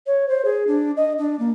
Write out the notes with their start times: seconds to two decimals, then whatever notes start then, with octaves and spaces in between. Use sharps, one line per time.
0.07 C#5
0.29 C5
0.45 G#4
0.67 D4
0.97 D#5
1.18 D4
1.39 A#3